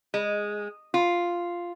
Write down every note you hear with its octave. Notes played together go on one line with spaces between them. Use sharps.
G#3
F4